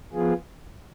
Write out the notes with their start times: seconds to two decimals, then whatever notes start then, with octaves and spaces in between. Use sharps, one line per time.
0.14 F3 B3 F4 G#4